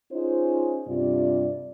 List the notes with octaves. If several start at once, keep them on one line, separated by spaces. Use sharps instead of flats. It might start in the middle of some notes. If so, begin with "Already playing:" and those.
C#4 D#4 F4 G#4 C5
G2 C3 F4 D5